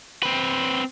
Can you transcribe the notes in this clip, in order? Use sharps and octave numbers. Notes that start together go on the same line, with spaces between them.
C4 B4